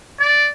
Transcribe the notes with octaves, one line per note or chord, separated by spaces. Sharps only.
D5